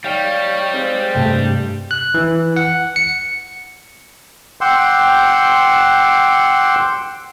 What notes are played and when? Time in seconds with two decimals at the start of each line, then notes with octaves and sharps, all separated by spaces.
0.04 G3 D#4 C#5 F5 G5
0.72 G#3 C4
1.15 G2 C3 A3 G5
1.91 F#6
2.14 E3
2.56 F#5
2.96 C#7
4.61 F#5 G5 C6 D6 E6